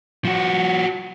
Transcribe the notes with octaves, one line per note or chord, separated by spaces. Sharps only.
F3 F#4